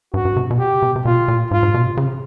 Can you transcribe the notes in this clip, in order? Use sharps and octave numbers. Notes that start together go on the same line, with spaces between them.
G2 F#4
G2
C3
B2
C3 G4
C3
C3
B2 F4
A#2
G#2 F4
G#2
B2
C3
C#3
C3